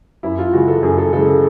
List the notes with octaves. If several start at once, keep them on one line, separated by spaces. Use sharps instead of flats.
F#2 E4
F4
C#3 E3 G#3 F#4
A4
F#2 G#4
A4
C#3 E3 G#3 A4